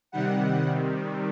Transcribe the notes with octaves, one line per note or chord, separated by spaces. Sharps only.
C3 D#3 G3 F#5